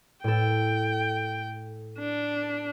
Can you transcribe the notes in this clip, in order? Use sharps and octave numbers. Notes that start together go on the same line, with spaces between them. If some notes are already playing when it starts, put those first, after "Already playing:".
A2 A4 G5
D4